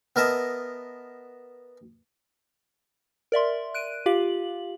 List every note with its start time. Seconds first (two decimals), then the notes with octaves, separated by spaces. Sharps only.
0.16 B3 A#4 D#5 E5 A5
3.32 A#4 D5 E5 C6
3.74 F#6 D7 D#7
4.06 F4 G4 F5 F#7